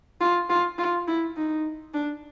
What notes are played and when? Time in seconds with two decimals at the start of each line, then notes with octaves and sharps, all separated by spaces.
0.21 F4
0.50 F4
0.79 F4
1.07 E4
1.37 D#4
1.94 D4